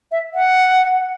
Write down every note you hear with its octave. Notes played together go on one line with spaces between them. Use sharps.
E5
F#5